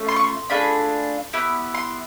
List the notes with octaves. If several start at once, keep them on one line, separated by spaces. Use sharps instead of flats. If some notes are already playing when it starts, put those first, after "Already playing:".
Already playing: A3 C#4 F4
C6
C#6
C6
A3 D4 F4 G#4 B5
B3 E4 G4
C6